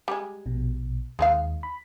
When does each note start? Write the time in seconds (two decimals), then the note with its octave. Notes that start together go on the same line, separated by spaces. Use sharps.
0.08 G3 G#3
0.46 A#1 B2
1.19 D#2 G#3 D#4 F5
1.63 B5